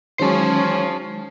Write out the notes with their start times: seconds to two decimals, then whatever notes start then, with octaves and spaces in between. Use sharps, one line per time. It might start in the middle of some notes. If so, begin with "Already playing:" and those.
0.20 D#3 F#3 G#3 C#4 C5 A5